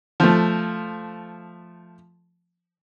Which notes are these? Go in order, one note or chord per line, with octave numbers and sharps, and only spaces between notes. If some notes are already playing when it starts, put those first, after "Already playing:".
F3 A3